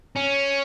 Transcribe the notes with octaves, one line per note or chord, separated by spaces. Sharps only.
C#4